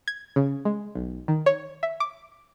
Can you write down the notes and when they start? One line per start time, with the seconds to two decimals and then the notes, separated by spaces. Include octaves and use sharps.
0.08 G#6
0.36 C#3
0.65 G#3
0.95 B1
1.28 D#3
1.46 C#5
1.83 E5
2.00 D6